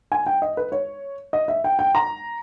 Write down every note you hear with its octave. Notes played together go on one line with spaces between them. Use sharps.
G#5
G5
D#5
B4
C#5
D#5
E5
G5
G5
A#5